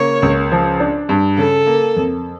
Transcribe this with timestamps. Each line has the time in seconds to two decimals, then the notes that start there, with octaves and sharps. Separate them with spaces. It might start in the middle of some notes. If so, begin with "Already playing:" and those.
Already playing: C#3 A#3 C#5
0.22 C#2
0.52 F3
0.80 D4
1.09 G2
1.38 C#3 A4
1.67 A#3
1.96 F2